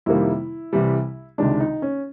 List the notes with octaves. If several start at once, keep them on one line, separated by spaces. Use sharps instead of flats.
F2 C3 D#3 G3 A#3 E4
C2 C3 E3 G3
C#2 C3 D#3 G#3 D4
D#4
C#4